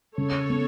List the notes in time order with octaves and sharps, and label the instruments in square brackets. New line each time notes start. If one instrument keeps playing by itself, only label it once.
[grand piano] C#3 [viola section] A4 C#5
[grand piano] B3